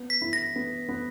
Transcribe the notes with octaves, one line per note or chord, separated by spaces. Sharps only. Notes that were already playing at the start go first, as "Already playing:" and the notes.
Already playing: B3
B6
E4
A#6
B3
B3